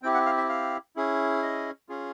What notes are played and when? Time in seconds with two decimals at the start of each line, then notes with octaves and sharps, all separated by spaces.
0.02 C4 E4 G4 G5
0.14 F#5
0.26 F5
0.37 E5
0.49 F5
0.96 C#4 E4 G#4
1.42 D#5
1.89 C#4 F4 G#4